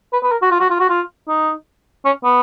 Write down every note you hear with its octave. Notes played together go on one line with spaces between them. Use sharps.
B4
B4
A#4
F#4
F4
F#4
F4
F#4
F4
D#4
C#4
B3